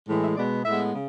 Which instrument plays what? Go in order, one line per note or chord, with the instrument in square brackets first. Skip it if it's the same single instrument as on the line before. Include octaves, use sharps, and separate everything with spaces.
[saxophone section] A2 E3 G#3
E5
B2 G#3 B3 D5
A2 G#3 B3 E5
C#3